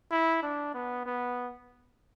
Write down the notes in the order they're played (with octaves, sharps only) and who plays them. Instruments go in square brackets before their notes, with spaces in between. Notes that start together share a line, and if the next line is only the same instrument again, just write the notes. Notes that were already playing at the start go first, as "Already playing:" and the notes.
[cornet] E4
D4
B3
B3